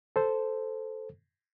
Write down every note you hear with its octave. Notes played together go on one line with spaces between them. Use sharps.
A4 C5